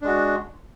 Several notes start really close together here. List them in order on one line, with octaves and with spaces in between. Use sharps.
D4 G#3 F#4